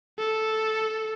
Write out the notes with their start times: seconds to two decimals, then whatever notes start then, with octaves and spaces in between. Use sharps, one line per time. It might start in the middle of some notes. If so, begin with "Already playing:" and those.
0.19 A4